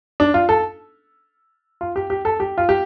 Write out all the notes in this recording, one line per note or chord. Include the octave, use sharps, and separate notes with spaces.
D4
F4
A4
F4
G4
G4
A4
G4
F4
G4